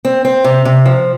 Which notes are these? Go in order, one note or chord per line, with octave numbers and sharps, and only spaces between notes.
C4
C4
C3
C3
F3